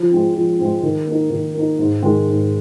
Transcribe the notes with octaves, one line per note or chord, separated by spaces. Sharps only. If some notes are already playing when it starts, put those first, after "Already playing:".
Already playing: F3
G#3 C4
F3
G#3 C4
D#3
A#3 D#4
D#3
A#3 D#4
G#2
D#3 G#3
G#2